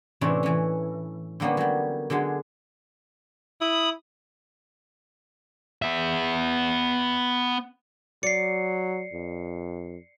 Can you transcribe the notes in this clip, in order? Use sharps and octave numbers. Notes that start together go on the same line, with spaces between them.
A2 C3 E3 C#4 D4 E4
E3 C#4
D3 G3 A#3 B3 C#4
F#3 G3
D3 F#3 G#3 D4
E4 B5 D#6
B3 E5
F#3 D5 C7 C#7
F2